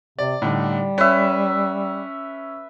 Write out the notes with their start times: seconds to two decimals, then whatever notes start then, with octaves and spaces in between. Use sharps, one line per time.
0.19 C3 D5
0.42 A2 D3 G3 D#4
0.98 C#4 B4 E5